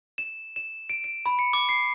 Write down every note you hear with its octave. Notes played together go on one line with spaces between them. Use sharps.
E7
E7
D7
D7
B5
C#7
D6
C7